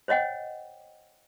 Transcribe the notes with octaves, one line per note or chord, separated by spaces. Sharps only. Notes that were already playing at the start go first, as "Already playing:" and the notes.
C5 C#5 D#5 F#5 G5